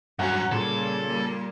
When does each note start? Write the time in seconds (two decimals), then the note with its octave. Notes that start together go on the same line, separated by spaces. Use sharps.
0.19 G2 F#3 C#4 F#5 G#5 A#5
0.51 A#2 C#3 G3 A#3 A4
1.07 G3 A#3